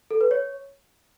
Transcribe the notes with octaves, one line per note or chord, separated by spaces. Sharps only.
A4
B4
C#5